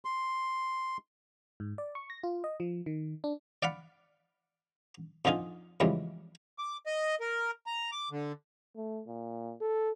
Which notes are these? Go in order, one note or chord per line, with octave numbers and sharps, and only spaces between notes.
C6
G#2
D5
C#6
A#6
F4
D#5
F3
D#3
D4
D5 F5 F#5 B5
F2 D3 D#4 F4 G#5
F2 C#3 E3 G3 G#3
D6
D#5
A#4
A#5
D6
D3
A3
A#2
A4